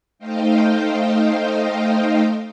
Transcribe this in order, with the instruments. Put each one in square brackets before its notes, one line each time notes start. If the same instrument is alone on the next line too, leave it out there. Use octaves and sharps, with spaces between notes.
[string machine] A3 D#4 C5 D#5 F5 G5